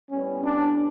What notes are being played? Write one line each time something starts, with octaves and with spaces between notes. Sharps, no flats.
A2 G3 B3 C#4
D4